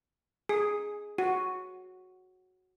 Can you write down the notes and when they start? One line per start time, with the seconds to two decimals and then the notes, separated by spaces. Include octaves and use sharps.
0.49 G#4
1.18 F#4